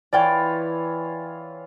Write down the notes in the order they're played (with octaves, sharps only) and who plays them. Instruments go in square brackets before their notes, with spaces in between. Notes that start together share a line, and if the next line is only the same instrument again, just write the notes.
[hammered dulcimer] E3 F4 C#5 [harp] D5 G5